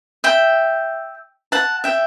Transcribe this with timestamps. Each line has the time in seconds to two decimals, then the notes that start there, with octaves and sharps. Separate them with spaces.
0.24 E5 G5
1.52 F#5 A5
1.84 E5 G5